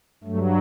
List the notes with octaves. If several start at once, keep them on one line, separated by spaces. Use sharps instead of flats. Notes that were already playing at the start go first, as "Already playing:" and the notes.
G2 F#3 A3